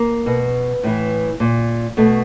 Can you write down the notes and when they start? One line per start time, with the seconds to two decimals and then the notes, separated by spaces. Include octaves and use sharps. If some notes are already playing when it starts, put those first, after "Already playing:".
Already playing: A#3
0.26 B2
0.83 A2 E3
1.40 A#2
1.97 B2 A3